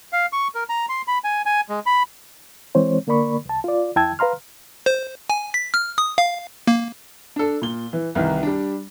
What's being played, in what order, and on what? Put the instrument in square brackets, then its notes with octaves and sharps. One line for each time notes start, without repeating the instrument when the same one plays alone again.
[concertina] F5
C#6
A#4
A#5
C6
B5
G#5
G#5
G#3
B5
[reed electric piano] E3 G#3 C4 C5 C#5
D3 A#3 A#4 D5 B5 C#6
C2 A5
F4 D5
F2 E4 G5 A5 E6 G#6
B4 F5 A#5 C6 F6
[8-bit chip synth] C5
G#5
B6
F6
D#6
F5
A#3
[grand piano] D4 A4
A#2 G7
E3
C2 D#3 E3
G3 D4